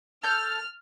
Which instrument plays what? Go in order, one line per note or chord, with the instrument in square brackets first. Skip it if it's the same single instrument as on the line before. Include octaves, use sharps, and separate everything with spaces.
[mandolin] A4 G6 [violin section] F6